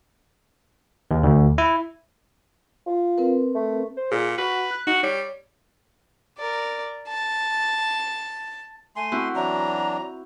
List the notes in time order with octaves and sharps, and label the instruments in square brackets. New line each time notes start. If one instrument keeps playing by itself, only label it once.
[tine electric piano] D#2
D2
E4
[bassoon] F4
[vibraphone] C4 A#4 B4
[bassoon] A3
[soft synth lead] C5
[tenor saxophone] A#2 [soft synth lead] G#4
[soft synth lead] F#4 [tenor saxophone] B4
[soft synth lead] F#6
[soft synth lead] D#4 [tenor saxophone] F#4
[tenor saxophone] G3 [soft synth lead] C#5
[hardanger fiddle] A#4 D5
A5
[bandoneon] A3 C6 [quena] G#5
[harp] C4 E4 F#4
[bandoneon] E3 F#3 D4 [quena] A#5